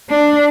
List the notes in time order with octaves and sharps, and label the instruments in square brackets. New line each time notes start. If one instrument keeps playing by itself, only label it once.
[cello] D4